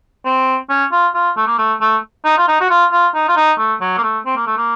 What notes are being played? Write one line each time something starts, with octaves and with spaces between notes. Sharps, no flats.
C4
C#4
F4
F4
A3
A#3
A3
A3
D#4
F4
D#4
F#4
F4
F4
D#4
F4
D#4
A3
F#3
A#3
A3
C4
A#3
A3
A#3